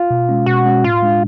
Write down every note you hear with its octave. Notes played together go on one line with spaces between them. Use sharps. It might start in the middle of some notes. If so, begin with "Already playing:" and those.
Already playing: F4
B2
G#3 C#4
B2 F#4
G#3 C#4
A2 F4
G#3 D4